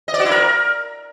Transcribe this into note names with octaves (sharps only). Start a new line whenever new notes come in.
D#5
D5
F#4
E4
A#4